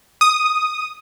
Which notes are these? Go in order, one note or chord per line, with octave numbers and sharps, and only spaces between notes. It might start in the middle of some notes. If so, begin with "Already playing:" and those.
D#6